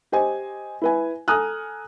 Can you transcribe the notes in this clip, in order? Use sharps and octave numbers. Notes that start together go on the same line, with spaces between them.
G4 C5 D#5 G#5
E4 B4 G#5
A4 G#5 A#5 D#6 F6 F#6